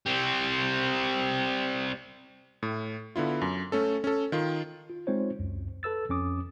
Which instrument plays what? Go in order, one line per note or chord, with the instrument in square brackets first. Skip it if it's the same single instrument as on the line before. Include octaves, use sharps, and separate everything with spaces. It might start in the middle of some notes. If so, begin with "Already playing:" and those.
[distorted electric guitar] G3 C4
[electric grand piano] A2
D3 B3 E4 F4
F#2
A3 C#4 A4
C#4 A4
D#3 F4
[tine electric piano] F4
G#3 C4 D#4 F4 C5 C#5
C#2 F#2
A4 B4 E6 A6
F2 C#4 D6 D#6